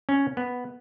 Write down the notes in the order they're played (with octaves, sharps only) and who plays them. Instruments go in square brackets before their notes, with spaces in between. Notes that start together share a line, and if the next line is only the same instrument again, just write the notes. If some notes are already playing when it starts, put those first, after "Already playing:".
[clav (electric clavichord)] C#4
B3